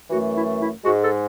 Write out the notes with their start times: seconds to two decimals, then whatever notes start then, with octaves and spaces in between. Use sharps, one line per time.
0.10 F#2 E3 A3 F#4
0.35 E4
0.60 E4
0.85 G#2 G#3 F#4
1.03 A4